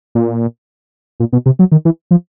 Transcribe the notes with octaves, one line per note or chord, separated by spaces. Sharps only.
A#2
A#2
B2
C3
F#3
D#3
E3
F3